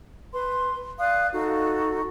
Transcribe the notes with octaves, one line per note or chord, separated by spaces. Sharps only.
B4 C6
D5 F5 D#6 F#6
D#4 F#4 A4